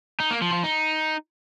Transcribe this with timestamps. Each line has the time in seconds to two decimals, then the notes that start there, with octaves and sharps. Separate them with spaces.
0.20 D#4
0.31 A#3
0.42 F3
0.53 F3
0.64 D#4